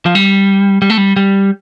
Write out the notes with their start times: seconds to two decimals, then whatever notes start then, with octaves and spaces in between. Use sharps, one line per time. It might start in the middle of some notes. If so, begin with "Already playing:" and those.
0.06 F3
0.15 G3
0.82 G3
0.90 A3
0.97 G3
1.16 G3